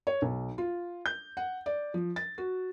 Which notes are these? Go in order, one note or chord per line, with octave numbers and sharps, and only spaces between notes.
C#5
B1
F4
G6
F#5
D5
F3
A6
F#4